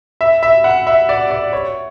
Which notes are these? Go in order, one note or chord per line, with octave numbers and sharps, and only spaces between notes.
E5
E5
F#5
E5
D5
D5
C#5